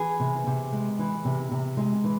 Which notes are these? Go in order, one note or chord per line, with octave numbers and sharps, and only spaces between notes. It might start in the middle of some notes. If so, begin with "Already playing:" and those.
Already playing: E3 G#4
C3
C3
G#3
E3
C3
C3
G#3
E3